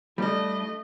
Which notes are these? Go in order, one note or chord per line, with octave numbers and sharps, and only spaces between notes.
G3 A3 D4 D#5